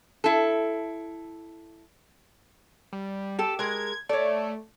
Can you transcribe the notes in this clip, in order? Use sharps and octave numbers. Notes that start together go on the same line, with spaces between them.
E4 A4
G3
G4 A4
G#3 A#4 G#6
A3 C#5 D5